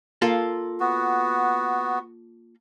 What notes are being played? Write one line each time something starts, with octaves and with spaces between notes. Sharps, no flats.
A#3 F4 A4
B3 F#4